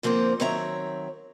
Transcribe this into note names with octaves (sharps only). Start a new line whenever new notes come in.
D3 F3 A#3 C4 C5
D#3 F#3 C4 C#5 E5 A#5